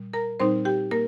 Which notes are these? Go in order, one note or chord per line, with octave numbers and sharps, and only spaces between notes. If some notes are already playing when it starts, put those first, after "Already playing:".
Already playing: A#2 G3
A#4 A#5
A#2 G3 C4 D#4 C5 C6
G4 G5
A#3 A#4